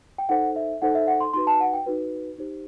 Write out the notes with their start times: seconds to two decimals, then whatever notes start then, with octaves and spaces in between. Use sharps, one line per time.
0.18 G5
0.29 D#4 A4 C5 F#5
0.56 E5
0.82 D#4 A4 C5 F#5
0.95 E5
1.07 F#5
1.21 C6
1.33 D#4 F#4 B4 C6
1.47 A5
1.61 F#5
1.74 G5
1.86 D#4 F#4 B4
2.38 D#4 G4 C5